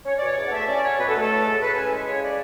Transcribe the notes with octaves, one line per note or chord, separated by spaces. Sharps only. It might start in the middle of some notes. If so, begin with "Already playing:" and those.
C#4 C#5
D5
B2
C#5
E2 D5
F#5
A3 E5
C#4 D5
F#3 C#5
B2 B4
A4
A3 B4
A4
A2
G#3
A2 B4
C#4 G#5
G#3 B4
C#3 C#5
D5